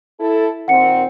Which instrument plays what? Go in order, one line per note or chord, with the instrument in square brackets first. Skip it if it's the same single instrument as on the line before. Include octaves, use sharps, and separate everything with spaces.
[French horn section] E4 A4
[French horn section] A#2 D#3 C4 [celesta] F#5 C#7